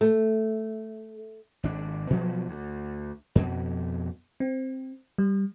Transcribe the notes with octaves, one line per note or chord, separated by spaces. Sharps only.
A3
G#1 D4
B2 F3 F#3
D2
F2 B2
C4
G3